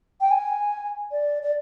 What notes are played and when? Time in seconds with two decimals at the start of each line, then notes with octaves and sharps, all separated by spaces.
0.21 G5
0.31 G#5
1.12 D5
1.43 D5